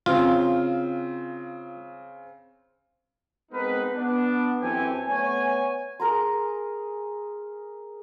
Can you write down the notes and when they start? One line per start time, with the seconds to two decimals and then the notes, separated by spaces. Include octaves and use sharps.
0.06 C#3 C4 F4
3.51 G#3 B3 C4 D#4 A#4 B4
3.95 B3 D4
4.60 F#2 E3 C4 G4 A4 G#5
5.07 A3 B3 C#5 G#5
6.00 G#4 A#4 A#5 C6